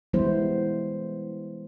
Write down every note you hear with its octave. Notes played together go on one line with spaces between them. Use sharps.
E3 G3 G#3 B3 E4 C5